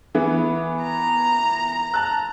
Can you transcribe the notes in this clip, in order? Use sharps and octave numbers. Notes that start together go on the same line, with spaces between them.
E3 B3
A#5
A5 F#6